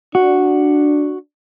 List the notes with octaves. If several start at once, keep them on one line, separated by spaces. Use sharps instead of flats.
D4 F#4